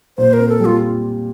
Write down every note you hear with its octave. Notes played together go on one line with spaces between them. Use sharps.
A#2 C5
A#4
C4
A4
G3
F4